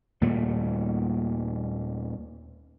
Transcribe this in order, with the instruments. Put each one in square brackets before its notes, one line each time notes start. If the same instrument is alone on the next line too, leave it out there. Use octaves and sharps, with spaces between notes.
[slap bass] D#2 A#2 G3 A3